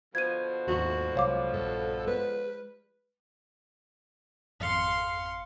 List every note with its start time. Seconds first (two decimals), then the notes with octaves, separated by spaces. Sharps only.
0.15 B2 D3 F3 G#6 D#7
0.68 D#2 G#2 F#4
1.15 C2 F#3 G#3 C#5 F5 D6
1.53 A#1 G2 A4
2.07 G#3 B4
4.60 G#1 F2 F5 C6 C#7